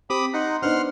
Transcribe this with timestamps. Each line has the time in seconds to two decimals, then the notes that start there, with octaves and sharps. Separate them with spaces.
0.10 C4 G4 B5 D6 D#6
0.34 D#4 F#5 A#5 C6
0.62 B3 D4 D#4 C5 F#5 C6 F6